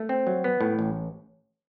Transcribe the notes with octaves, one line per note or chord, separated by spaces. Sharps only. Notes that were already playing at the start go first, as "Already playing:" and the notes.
Already playing: A3
C4
F#3
B3
A2
A1